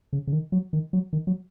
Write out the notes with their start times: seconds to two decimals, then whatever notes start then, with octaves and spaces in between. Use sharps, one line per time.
0.13 C#3
0.27 C#3
0.32 D#3
0.52 F#3
0.73 D#3
0.93 F#3
1.13 D#3
1.27 F#3